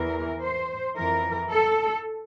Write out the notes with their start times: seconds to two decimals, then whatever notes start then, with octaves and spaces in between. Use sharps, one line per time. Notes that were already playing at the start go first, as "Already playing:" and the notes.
Already playing: E2 E3 A#4
0.42 C5
0.96 F2 E3 A#4
1.52 A4